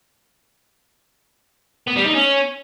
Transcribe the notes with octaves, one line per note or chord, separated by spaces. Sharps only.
B3
G3
D#4
C#4